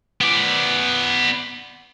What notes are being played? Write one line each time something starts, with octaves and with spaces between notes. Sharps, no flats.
B3 D5